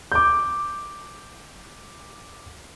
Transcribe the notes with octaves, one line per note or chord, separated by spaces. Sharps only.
D6 G6